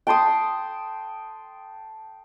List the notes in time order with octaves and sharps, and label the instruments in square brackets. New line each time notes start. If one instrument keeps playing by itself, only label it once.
[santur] G5 A5 C6 D#6